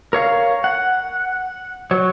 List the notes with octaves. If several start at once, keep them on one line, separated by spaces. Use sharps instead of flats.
A#4 C#5 F5
F#5
F#3 C#5